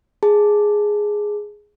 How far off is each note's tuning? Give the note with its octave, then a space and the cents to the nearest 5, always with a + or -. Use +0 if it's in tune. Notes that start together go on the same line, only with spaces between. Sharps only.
G#4 +0 A5 +0